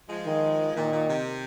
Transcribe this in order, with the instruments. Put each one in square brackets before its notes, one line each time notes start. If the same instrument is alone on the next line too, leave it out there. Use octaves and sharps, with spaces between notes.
[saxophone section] F3 G#3
[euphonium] D#3
[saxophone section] A#2 [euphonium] D#3
[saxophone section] A#2
C3